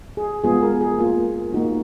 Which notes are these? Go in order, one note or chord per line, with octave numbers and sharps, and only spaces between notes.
G#4
G#3 B3 F4 G#4
A#4
G#4
A#3 F4
A#3 D#4 F#4